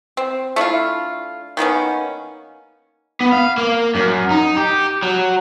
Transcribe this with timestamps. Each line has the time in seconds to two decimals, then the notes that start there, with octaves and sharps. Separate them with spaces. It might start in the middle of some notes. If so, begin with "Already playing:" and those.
0.17 C4
0.56 A3 D4 E4 F4
1.57 D#3 A#3 B3 C#4
3.21 B3
3.32 F5
3.58 A#3
3.95 F#2
4.31 D#4
4.57 G4
5.03 F#3